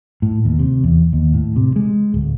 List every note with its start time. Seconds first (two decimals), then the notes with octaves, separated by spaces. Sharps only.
0.22 A2
0.45 D#2
0.59 C3
0.84 E2
1.13 D#2
1.34 A2
1.56 C3
1.76 G#3
2.14 D1